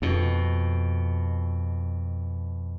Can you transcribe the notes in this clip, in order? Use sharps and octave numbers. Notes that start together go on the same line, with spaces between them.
F2 B2